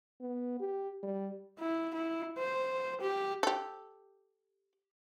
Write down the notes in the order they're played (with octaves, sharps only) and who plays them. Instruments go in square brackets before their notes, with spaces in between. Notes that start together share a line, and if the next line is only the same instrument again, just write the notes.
[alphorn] B3
G4
G3
[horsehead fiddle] E4
E4
C5
G4
[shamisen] G4 A4